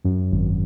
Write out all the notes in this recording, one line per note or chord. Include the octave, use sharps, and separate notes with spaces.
F#2
G#1